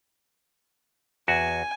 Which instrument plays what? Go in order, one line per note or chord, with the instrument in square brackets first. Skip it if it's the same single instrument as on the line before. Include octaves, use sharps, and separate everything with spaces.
[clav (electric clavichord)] E2 F#4 [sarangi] G#5